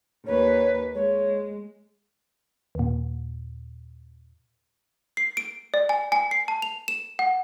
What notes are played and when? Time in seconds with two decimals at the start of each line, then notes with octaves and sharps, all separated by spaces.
0.26 D#2 B4 C#5
0.95 G#3 C#5
2.75 D#2 A#2
5.17 C7
5.37 D7
5.74 D5
5.89 G#5
6.12 G#5
6.31 C7
6.48 A5
6.62 F7
6.88 E7
7.19 F#5